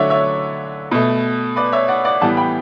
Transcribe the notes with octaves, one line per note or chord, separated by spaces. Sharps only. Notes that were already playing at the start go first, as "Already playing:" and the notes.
Already playing: D3 F#3 A3 C#5 D5 E5 F#5
C#5 E5
B2 A3
B4 D5
C#5 E5
D5 F#5
D5 F#5
A2 E3 G3 B3 F#5 A5
G5 B5